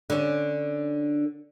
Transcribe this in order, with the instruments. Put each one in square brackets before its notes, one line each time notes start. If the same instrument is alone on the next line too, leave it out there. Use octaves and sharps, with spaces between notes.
[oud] D3 C#4